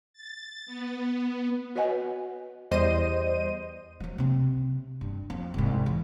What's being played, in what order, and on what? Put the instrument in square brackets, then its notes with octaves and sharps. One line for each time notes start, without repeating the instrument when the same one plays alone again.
[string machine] A6
B3
[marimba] F#4 B4 C#5 D#5 F#5 G#5
[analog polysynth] E2 G3 C5 D#5 D#7
[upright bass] F3 F#3
C3 C4
G2
F2
C2 G#2
E3